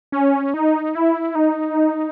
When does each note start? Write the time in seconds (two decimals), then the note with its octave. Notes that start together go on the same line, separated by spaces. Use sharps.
0.12 C#4
0.54 D#4
0.95 E4
1.35 D#4